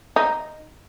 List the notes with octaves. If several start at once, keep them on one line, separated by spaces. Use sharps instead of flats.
D#4